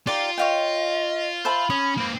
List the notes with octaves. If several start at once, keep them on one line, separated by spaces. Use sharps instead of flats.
D#4 F4 G4 D5
C#5 D#5 F5 G5
C5 E5 A5 B5
C#4 D#6
A#3 C4